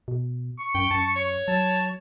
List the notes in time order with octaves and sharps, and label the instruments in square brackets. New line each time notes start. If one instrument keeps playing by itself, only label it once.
[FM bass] B2
[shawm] C#6
[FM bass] F#2 [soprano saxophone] G5
[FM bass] F#2 [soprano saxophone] A5
[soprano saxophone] C#5
[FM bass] F#3 [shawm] A5